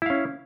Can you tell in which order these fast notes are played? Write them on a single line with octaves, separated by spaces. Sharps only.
E4 F5 C#4